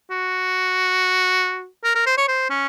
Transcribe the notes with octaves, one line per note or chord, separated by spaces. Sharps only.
F#4
A#4
A#4
C5
C#5
C5
C#4